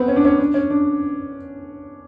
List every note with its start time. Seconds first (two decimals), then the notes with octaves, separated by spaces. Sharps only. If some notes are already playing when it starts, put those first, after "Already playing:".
Already playing: B3 C4
0.08 C#4
0.16 D4
0.25 C#4
0.39 D4
0.54 C#4
0.70 D4